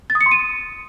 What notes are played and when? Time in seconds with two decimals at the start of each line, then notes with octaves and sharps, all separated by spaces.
0.10 A6
0.15 D#6
0.21 C#7
0.26 C6
0.31 D#7